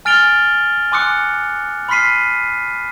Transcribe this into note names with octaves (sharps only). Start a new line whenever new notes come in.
G#5 F6 A6 D7 F7 G7
G#5 C6 D6 D#6 F#6 C#7
B5 C6 F6 B6 C7 D#7